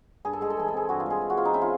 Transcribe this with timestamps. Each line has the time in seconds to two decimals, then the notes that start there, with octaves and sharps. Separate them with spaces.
0.25 G2 G#4
0.33 A4
0.41 G#3 G#4
0.50 A4
0.57 E3 G#4
0.68 A4
0.74 C4 G#4
0.89 G2 F#4
1.00 F4
1.06 G#3 G#4
1.22 E3
1.30 F#4
1.37 C4 F4
1.45 D#4
1.54 C#3 E4
1.62 F4